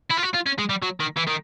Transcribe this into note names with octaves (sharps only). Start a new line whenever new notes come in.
E4
F4
F#4
F4
C#4
G#3
G3
F#3
D#3
E3
D#3